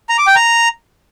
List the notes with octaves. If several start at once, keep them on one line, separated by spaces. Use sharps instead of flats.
A#5
D6
G5
A#5